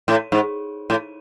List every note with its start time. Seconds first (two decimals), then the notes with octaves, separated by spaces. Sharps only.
0.08 A2
0.32 G#2
0.90 A2